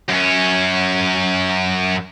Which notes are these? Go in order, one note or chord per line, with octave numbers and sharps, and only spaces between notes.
F#2 C#4